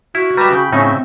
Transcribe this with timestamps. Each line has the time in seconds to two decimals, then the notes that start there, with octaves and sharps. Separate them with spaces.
0.15 E4 F#4 F6
0.37 G3 G4 B4 E5 A#5
0.50 C#3 G5 B5
0.72 A2 C#3 C4 C#4 D#4 E5